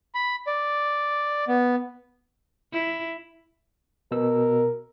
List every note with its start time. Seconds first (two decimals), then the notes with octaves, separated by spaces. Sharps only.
0.15 B5
0.47 D5
1.48 B3
2.72 E4
4.11 B2 A#4 E6